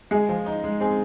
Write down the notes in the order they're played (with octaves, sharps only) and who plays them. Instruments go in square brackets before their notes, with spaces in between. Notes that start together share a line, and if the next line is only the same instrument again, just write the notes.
[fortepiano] G#3 [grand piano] G#4
[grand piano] F3
D#4
G#3
[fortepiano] C4 [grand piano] G#4